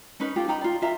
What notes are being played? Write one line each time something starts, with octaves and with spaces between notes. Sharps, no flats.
C#4 D#4 B4
F4 G4 A4
D#4 G5 A#5 B5
F4 D5
F4 E5 A#5